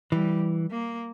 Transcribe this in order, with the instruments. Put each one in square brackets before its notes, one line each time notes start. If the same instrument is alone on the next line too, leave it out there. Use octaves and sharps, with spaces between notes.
[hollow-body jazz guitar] E3 [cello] G3
[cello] A#3